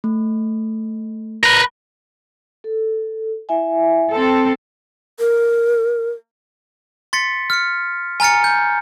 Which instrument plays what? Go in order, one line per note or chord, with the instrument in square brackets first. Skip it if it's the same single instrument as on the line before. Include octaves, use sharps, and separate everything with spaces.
[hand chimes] A3
[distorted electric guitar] A#4 B4
[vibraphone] A4
E4 E5 G#5
[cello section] C4 A4
[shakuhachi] A#4
[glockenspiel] C6 A6 B6 C#7
F6 C#7
G#5 A#5 F6 A6 C#7
G6